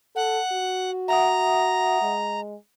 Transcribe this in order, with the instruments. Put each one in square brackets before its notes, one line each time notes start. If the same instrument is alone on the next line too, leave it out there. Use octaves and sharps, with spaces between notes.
[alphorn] A4 [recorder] F#5
[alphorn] F#4
[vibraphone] E5 F#5 D#6 [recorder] A#5
[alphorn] G#3